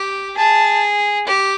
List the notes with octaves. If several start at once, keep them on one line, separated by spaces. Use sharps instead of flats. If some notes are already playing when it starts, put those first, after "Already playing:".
Already playing: G4
G#4 A5
G4